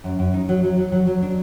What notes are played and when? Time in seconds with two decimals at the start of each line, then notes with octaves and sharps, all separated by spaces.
0.04 F#2
0.19 F#2
0.34 D#4
0.49 F#3
0.63 F#3
0.77 F#3
0.92 F#3
1.07 F#3
1.22 D4